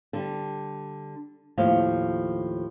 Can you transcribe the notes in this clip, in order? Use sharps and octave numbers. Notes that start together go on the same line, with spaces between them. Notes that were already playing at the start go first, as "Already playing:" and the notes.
D3 G3
D#2 A2 F3 F5